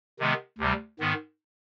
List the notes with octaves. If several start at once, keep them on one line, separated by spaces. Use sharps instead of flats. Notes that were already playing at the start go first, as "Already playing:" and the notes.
C3 D#3 G#3 B3
D2 C3 G3
G#2 D#3 B3